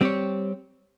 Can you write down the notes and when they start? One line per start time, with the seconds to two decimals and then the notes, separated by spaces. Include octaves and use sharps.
0.01 G3 C4 G4 C#5